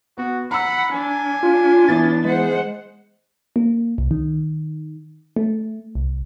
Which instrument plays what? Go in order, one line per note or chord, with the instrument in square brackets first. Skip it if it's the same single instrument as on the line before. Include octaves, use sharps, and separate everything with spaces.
[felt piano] B3 [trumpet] F#4
[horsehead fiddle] F#5 [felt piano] A#5 E6 [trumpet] B5
[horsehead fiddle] D4 [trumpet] G#5
[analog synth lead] F4
[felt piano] E3 B3 E4 [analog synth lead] A6
[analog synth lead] G#3 [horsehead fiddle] C5 F#5
[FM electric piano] A#3
C2
D#3
A3
C2